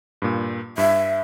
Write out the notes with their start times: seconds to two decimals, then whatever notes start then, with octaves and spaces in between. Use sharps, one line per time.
0.22 G2 A#2
0.78 G2 E5